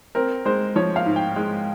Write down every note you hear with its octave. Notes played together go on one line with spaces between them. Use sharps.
C4 A#4
G#3 C5
F3 C#5
F5
G#2
G5
G#3